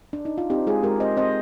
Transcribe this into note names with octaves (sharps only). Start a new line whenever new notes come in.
D4
D#4
F4
C4 D#4 G4
G#3 F4 G#4
G#3 G4 A#4
C4 C5 D#5
C4 C5 D#5